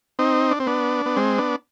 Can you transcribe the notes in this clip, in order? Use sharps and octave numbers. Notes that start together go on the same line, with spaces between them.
C4 D#4
D4
C4
B3 D4
B3
G#3 C4
B3 D4